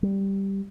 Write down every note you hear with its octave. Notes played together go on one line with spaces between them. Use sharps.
G3